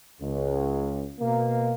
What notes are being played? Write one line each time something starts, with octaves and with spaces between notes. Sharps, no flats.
C#2
B2 A#3